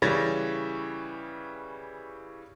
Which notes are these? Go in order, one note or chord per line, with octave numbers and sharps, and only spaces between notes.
C#3 E3 G3 C#5 A6 A#6